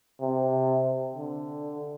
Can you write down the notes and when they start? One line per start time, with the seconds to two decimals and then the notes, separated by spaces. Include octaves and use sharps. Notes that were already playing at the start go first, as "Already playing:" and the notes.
0.20 C3
1.14 D3